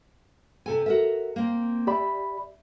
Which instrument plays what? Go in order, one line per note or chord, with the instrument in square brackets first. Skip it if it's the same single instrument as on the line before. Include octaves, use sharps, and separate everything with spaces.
[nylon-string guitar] C3 A4 G#5
F#4 A#4 E5
A#3 C4
[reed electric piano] G4 D5 B5 [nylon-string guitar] E5